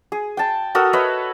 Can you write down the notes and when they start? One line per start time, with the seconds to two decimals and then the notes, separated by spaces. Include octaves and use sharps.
0.12 G#4
0.37 G5 A5
0.75 F#4 A4 A#4 D#6
0.93 B4 C#5 D#5 E5